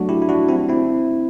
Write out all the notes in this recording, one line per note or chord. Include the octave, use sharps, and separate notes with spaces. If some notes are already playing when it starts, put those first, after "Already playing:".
Already playing: F#3 A3 D4 F#4
E4 G4
E4
D4 F#4
C4 E4
C4 E4